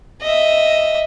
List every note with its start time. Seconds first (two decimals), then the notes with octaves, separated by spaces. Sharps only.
0.22 D#5 E5